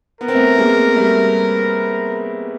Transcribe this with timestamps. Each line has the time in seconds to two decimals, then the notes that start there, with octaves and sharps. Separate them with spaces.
0.21 B3 A#4
0.28 C4
0.35 A3 B3
0.58 G#3 A#3
0.96 G3 A3